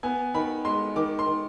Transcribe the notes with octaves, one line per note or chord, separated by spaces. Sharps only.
B3 G#5
D#3 B5
G#3 C6
D#3 D6
C6
D#3